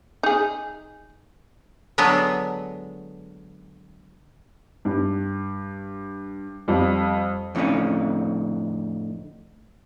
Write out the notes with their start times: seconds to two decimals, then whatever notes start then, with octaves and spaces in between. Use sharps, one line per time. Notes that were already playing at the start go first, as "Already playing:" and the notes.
0.23 D#4 G#4
1.98 D3 F#3 G#3 B3
4.85 G2
6.68 F2 G3
7.55 F2 A2 D3 C4 C#4 D#4